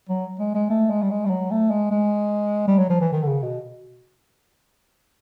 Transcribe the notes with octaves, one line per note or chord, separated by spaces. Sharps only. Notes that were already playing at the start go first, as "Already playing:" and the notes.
F#3
G#3
G#3
A3
G#3
G3
G#3
G3
F#3
A3
G#3
G#3
G3
F#3
F3
E3
D#3
D3
C#3
B2